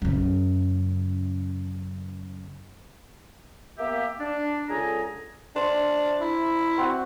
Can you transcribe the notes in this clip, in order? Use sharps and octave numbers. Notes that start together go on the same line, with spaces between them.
F#2 C#3
A#3 B3 G4 E5
D4
C#2 D3 G#4 A4 G#5 A#5
D4 C5
E4
C4 F#4